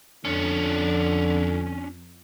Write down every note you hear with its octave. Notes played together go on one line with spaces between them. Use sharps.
F2 D3 C#4 D4